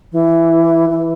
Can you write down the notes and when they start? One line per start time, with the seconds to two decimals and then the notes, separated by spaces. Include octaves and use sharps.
0.12 E3
0.89 E3